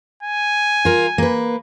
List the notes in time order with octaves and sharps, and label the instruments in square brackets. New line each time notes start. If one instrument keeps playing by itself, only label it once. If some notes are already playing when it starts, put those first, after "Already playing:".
[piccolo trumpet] G#5
[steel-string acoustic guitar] F4 A#4
A#3 B4